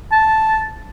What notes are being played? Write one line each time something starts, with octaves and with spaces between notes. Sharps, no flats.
A5